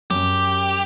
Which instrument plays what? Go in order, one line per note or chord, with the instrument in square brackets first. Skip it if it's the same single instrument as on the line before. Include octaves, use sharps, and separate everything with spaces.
[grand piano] F#2 [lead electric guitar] G4